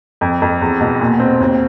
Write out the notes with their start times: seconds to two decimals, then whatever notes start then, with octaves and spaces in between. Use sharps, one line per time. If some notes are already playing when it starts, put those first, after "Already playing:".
0.21 F2
0.42 F2
0.61 E2
0.81 B2
1.00 A#2
1.20 C4
1.40 D#2